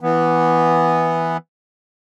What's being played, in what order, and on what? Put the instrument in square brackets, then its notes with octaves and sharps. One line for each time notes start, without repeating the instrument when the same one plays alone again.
[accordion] E3 B3